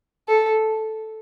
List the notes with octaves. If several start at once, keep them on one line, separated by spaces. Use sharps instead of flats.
A4